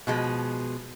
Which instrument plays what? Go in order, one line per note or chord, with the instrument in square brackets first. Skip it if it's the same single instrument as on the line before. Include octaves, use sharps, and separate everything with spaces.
[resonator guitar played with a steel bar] B2 F3 G#3